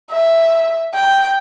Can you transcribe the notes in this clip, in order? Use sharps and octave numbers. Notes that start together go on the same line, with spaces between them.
E5
G5